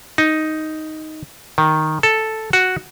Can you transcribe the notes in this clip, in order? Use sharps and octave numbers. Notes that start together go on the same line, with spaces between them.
D#4
D#3
A4
F#4